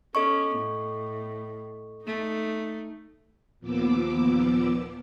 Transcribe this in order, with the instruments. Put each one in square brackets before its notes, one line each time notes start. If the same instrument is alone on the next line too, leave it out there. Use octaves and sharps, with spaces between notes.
[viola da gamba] C#4 [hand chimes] A4 D#5 C#6
[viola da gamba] A2
A3 D#4
[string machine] D#2 A#2 F3 B3 D6 E6